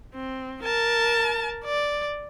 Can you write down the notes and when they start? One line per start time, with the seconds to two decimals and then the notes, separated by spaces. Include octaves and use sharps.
0.14 C4
0.63 A#4 A5
1.64 D5